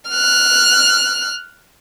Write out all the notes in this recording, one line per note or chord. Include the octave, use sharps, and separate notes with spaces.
F6 F#6